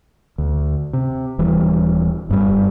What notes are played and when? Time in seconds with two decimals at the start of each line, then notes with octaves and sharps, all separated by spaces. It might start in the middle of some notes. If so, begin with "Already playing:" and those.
0.38 D2
0.93 C3
1.38 D#1 E3 G3
2.30 F#1 G2 D3 G3